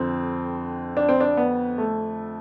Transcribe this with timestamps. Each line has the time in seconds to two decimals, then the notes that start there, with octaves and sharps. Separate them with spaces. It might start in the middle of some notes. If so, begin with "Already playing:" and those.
Already playing: F2 D3 C4
0.97 D4
1.09 C4
1.20 D4
1.37 B3
1.78 A3